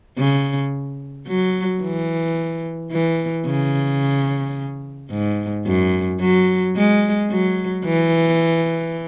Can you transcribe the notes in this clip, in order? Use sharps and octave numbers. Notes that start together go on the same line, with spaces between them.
C#3
F#3
E3
E3
C#3
G#2
F#2
F#3
G#3
F#3
E3